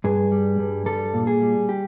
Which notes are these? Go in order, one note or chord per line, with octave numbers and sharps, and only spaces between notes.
G2 G#4
G3
G2
G3 A4
A#2
G#4
G3
G4